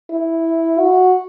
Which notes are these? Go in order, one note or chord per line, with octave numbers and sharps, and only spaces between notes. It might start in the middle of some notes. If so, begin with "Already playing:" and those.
E4
F#4